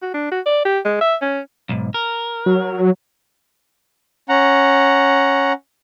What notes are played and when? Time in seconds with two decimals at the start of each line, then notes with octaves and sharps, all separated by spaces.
0.02 F#4
0.14 D4
0.32 F#4
0.46 D5
0.65 G4
0.85 G#3
1.01 E5
1.22 C#4
1.69 B1 G#2
1.94 A#4
2.46 F#3
4.29 C#4 F#5 A#5